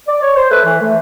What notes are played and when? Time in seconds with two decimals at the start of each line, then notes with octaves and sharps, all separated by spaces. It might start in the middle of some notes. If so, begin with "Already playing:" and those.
0.08 D5
0.22 C#5
0.36 C5
0.50 A3 A4 B4
0.65 E3
0.80 A3